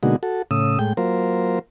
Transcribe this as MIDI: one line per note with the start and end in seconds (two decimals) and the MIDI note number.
0.03 0.16 47
0.03 0.16 50
0.03 0.16 56
0.03 0.16 58
0.03 0.16 63
0.03 0.16 66
0.23 0.42 66
0.23 0.42 69
0.51 0.79 45
0.51 0.79 49
0.51 0.79 87
0.51 0.79 88
0.79 0.93 45
0.79 0.93 56
0.79 0.93 79
0.97 1.59 54
0.97 1.59 58
0.97 1.59 65
0.97 1.59 70
0.97 1.59 72